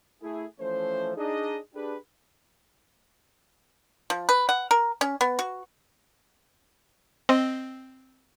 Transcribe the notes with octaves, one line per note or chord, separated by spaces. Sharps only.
A3 E4 G#4
E3 F3 A3 C#4 C5
D4 D#4 G#4 D#5
D4 G4 G#4 B4
F3
B4
F#5
A#4
C#4
B3
F#4
C4 D#5